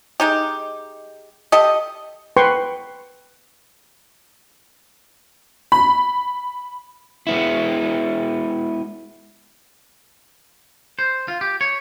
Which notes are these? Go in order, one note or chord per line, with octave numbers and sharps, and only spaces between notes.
G#3 D#4 G4
G4 A4 D#5
B4 G5 C6 C#6
B5
G#3 B3 E4
C5
F4
G4
C#5